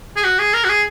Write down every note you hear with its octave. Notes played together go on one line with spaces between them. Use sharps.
G#4
F#4
G#4
A#4
F#4
G#4